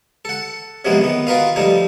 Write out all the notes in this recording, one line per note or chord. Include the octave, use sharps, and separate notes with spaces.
A4 F#5
C3 F3 F#3 G#3 A#3 B3
D#3 B3
F4 F#4 A#4 B4 D#5 F5
F3 G3 A3 D#4